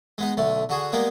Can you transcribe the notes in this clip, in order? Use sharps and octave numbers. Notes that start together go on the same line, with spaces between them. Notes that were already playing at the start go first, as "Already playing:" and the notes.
G#3 B3 D#4
B1 D3 A3
D3 F#4 G#4
G3 G#3 A#3 B3 G#4